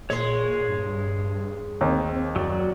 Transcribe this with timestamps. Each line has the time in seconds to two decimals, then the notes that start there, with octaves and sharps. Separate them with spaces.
0.10 A#2 G#3 C#5 C6
0.68 G2
1.81 D#2 C4
2.36 F#2 F#3 D5